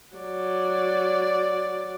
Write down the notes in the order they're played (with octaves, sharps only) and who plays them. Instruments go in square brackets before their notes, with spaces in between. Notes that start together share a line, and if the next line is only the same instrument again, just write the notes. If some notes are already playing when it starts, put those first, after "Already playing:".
[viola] F#3 D5